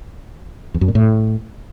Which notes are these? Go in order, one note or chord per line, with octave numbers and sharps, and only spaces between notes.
E2
F#2
A#2
A2